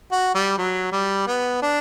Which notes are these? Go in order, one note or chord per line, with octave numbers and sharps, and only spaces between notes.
F#4
G3
F#3
G3
B3
D4